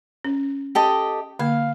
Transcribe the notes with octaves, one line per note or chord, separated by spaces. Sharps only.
C#4
G4 A4 D#5
D3 A#3 F5